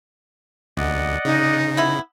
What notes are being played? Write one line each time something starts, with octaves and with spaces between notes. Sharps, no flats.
D2 D5 D#5 F#5
C#3 D#4
B3 E4